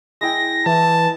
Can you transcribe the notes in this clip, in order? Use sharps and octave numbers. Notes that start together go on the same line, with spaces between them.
G#3 E4 G5 A#6
E3 A5